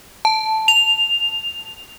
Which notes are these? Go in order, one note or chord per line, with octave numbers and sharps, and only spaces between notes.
A5
F7